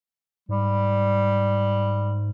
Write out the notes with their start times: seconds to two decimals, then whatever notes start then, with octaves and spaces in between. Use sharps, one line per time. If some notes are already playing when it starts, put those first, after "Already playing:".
0.49 G#2 G3